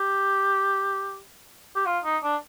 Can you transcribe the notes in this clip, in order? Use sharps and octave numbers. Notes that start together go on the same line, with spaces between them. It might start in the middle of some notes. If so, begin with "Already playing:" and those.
Already playing: G4
G4
F4
D#4
D4